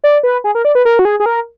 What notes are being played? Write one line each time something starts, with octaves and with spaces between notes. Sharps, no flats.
D5
B4
G#4
A#4
D5
B4
A#4
F#4
G#4
G#4
A#4